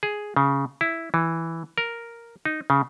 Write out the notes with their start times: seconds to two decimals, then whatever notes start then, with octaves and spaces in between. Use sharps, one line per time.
0.03 G#4
0.37 C#3
0.81 E4
1.14 E3
1.78 A#4
2.45 D#4
2.70 C#3